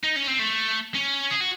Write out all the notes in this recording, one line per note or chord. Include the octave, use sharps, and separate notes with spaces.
D#4
C#4
C4
A3
C#4
G#4
F#4